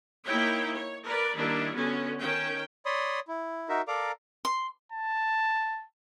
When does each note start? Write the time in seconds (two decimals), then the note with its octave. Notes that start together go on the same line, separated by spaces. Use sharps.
0.25 A#3 D#4 E4 C#5 G5
0.73 C#5
1.04 A#4 B4 D5
1.37 D#3 G3 A#3 D4 E4
1.75 D3 B3 C#4 F#4
2.20 D#3 C#4 G5
2.86 C#5 D5 B5 C6 D#6
3.28 E4
3.69 D#4 F#4 A#4 E5
3.88 A4 A#4 D5 F5 A#5 D6
4.45 C6
4.92 A5